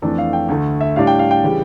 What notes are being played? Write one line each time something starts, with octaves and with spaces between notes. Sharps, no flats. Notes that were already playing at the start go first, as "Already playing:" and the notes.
F2 E3 A3 D4 A4
F5
G5
D2 D3 A3
E5
A2 G3 D4 F5
G5
F5
G5
C#3 E3 G3